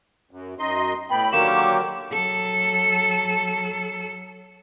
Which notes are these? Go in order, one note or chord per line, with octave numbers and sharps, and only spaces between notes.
F#2
F#2 D#4 D#5 C6
A2 B3 G5 B5
D3 D#3 F#3 A#3 G4 C#6 E7
D6
F#3 A4